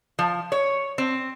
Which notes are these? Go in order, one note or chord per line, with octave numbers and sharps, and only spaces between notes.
F3
C#5
C4